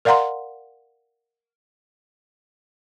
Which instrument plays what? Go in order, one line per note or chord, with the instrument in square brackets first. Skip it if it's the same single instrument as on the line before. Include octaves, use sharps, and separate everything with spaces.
[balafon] A#4 D5 F5 F#5 A#5 C6